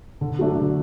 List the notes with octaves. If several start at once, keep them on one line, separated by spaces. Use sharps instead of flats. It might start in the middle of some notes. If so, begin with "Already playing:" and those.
D3
F#3 A3 D4
D3